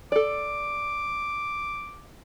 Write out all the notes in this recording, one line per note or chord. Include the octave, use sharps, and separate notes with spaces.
A4 D5 D6